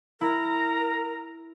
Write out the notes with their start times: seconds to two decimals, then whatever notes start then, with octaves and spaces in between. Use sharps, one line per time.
0.21 E4 A#4 A#5